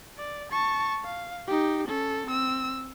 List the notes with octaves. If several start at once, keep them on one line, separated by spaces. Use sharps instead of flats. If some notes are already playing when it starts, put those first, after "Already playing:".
D5
A5 C#6
F5
D#4 G4
C#4 A4
C4 E6